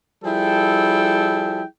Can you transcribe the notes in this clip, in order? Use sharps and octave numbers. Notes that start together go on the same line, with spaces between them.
F3 G3 E4 G#4 A4 G5